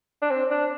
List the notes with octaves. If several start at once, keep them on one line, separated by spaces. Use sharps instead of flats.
D4
C4
D4